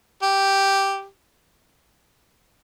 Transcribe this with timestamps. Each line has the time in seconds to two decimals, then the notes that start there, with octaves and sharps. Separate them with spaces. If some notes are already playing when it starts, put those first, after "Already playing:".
0.23 G4